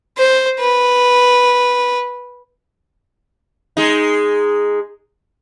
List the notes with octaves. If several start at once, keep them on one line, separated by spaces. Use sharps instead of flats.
C5
B4
G#3 D#4